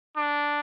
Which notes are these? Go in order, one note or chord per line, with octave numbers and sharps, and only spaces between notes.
D4